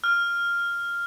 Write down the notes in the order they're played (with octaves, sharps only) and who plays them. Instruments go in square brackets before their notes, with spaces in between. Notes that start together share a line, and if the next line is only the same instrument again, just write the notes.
[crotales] F6